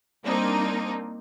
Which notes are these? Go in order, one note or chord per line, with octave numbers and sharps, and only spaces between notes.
G3 A#3 C4 D4 D#4